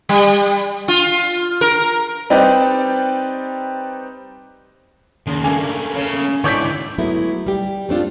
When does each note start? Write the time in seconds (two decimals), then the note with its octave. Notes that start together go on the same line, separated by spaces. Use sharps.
0.09 G3
0.88 F4
1.61 A#4
2.30 G3 C4 D#4 G4 B4 D5
5.27 D#2 C#3
5.44 G2 A3 A#3 D4 A4 G#5
5.95 C#3 C#4
6.44 G#2 D3 E3 C#5 D5 C#6 G6 B6
6.98 F#3 G#3 A3 B3 E4
7.46 G3 G4
7.89 A3 C4 D4 F4